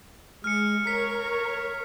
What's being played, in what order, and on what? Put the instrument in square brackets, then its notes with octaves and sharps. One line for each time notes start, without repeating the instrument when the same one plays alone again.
[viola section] G#3 [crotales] F6 C#7
[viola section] A#4 C#5 [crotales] B6